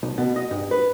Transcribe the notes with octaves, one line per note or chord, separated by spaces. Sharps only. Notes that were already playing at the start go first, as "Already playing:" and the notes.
B1
B2
D#5
G2
B4